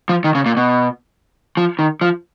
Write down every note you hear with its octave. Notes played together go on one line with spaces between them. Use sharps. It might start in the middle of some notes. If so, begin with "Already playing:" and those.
F3
D#3
C#3
A#2
B2
F3
D#3
F3